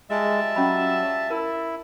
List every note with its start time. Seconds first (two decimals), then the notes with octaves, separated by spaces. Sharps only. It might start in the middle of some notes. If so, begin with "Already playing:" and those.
0.10 G3 G#3 F4 E5 A5
0.56 F#3 C#4 G5 B5
1.30 E4 A#4